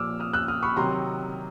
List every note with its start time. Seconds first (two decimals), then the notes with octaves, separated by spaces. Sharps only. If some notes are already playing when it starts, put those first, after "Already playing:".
Already playing: A#2 F3 D6 E6 F6
0.20 D#6 F6
0.33 E6 F#6
0.48 D#6 F6
0.63 B5 C#6
0.76 C3 D#3 F#3 A#5 C6